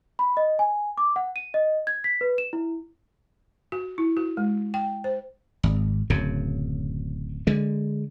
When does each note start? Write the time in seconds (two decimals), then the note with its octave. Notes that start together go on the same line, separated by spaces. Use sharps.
0.19 B5
0.37 D#5
0.59 G#5
0.98 D6
1.16 F#5
1.36 D#7
1.54 D#5
1.87 G#6
2.04 B6
2.21 B4
2.38 E7
2.53 E4
3.72 F#4
3.98 E4
4.17 F#4
4.37 G#3
4.74 G5
5.04 C5
5.63 G#1
6.10 D1 F#2 C#3
7.47 D3 G#3